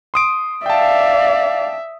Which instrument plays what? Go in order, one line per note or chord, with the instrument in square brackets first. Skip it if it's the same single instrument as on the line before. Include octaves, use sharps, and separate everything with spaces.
[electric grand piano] C6 D#6 D7
[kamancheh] D5 F5 [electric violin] E5 [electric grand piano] G5 A5